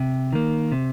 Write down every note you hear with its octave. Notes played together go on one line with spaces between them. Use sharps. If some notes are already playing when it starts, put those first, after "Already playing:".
Already playing: C3
D#3 A#3
C3